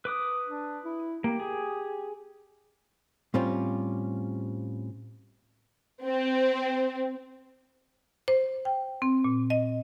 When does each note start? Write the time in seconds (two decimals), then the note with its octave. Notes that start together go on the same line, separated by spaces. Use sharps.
0.05 B4 D6 D#6
0.47 D4
0.85 E4
1.24 A#3 G4
1.40 G#4
3.34 A2 G3 C4 C#4 F4
6.04 C4
8.28 C5
8.65 G5
9.02 C4
9.24 A#2
9.50 D#5